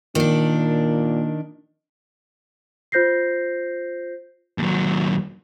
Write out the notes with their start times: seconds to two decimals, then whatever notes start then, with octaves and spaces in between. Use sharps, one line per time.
0.15 A#2 D#3 D4
2.92 F4 C5 G6 A#6 C7
4.58 D#2 F#3